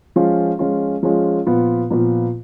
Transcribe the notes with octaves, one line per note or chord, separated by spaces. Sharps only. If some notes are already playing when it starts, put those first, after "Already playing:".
F3 G#3 C#4 F4
F3 G#3 C#4 F4
F3 G#3 C#4 F4
A#2 F3 B3 F4 B4
A#2 F3 B3 F4 B4